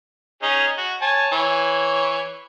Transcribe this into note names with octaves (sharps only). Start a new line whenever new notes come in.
C#4 D#4 G#4
F#4
C#5 G#5 A5
E3 C#5